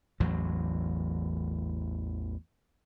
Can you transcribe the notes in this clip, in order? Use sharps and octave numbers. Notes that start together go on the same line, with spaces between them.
A1 E2 A2 F#3